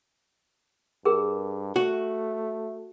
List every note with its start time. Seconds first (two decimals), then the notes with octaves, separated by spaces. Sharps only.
1.05 G2 G#4 A#4
1.76 A3 F#4